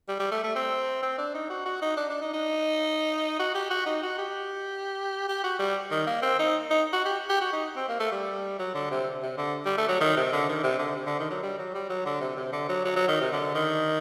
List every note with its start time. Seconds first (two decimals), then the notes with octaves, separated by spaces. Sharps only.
0.08 G3
0.20 G3
0.31 A3
0.44 A3
0.55 C4
1.02 C4
1.18 D4
1.34 D#4
1.50 F#4
1.66 F#4
1.82 D#4
1.97 D4
2.09 D4
2.21 D#4
2.33 D#4
3.40 F#4
3.55 G4
3.70 F#4
3.86 D#4
4.03 F#4
4.18 G4
5.28 G4
5.44 F#4
5.59 G3
5.91 D#3
6.07 A#3
6.22 C4
6.39 D#4
6.70 D#4
6.93 F#4
7.05 G4
7.29 G4
7.41 F#4
7.53 D#4
7.76 C4
7.89 A#3
8.00 A3
8.12 G3
8.59 F#3
8.74 D3
8.91 C3
9.23 C3
9.37 D3
9.65 G3
9.78 A3
9.88 F#3
10.01 D#3
10.17 C3
10.32 D3
10.49 D#3
10.63 C3
10.79 D3
10.96 C3
11.06 D3
11.19 D#3
11.30 F#3
11.43 G3
11.59 F#3
11.74 G3
11.89 F#3
12.05 D3
12.21 C3
12.36 C3
12.52 D3
12.69 F#3
12.85 F#3
12.96 F#3
13.08 D#3
13.20 C3
13.32 D3
13.55 D#3